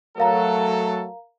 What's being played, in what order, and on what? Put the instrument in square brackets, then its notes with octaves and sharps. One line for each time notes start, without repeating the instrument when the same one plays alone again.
[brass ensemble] F#3 A3 A4 [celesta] A#4 F5 A#5